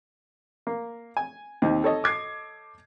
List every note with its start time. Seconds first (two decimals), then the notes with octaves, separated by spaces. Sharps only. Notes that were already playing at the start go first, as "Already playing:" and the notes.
0.67 A#3
1.17 G#5
1.62 D#2 C4 D#4
1.84 A4 C#5 D#5
2.04 D6 G#6 C7